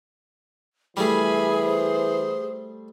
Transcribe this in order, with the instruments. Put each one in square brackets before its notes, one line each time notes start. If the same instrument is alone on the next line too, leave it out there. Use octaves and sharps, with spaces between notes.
[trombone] E3 [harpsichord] G3 A3 [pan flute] G#4 [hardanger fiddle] G#5 B5
[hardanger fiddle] C5